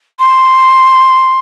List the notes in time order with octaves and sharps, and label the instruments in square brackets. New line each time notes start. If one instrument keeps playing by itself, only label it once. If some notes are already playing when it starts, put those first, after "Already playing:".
[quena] C6